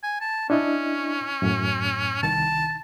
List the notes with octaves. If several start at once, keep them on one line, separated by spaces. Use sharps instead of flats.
G#5
A5
C#4 D4 E4 D#5
F#2 A2
C2 D#3 A5 A6